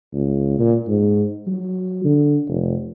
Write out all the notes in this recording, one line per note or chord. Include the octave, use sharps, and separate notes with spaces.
C#2
A#2
G#2
F#3
D3
F1